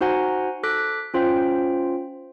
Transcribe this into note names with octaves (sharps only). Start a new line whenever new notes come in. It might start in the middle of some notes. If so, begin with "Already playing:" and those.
D#4 F#4 C5 F#5 G#5 A#5
A4 D6 F#6 B6
C#4 F4 C5 G5